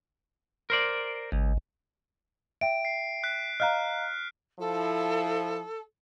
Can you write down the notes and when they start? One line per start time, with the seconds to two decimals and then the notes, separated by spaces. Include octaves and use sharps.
0.70 A#4 C5 D5
1.32 G#1 C#2
2.61 E5 G5 D7
2.85 C7
3.24 F#6 B6
3.60 D#5 F5 A#5 F6 F#6
4.59 F3 E4 A4